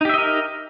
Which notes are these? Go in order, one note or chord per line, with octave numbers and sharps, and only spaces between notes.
D#4 G4 A#4 D#5 E5